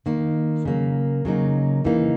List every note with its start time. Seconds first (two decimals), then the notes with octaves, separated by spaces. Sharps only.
0.06 D#3 A#3 D#4
0.65 C#3 F#3 A#3
1.25 C#3 F#3 A#3 D#4
1.84 C#3 E3 A#3 D#4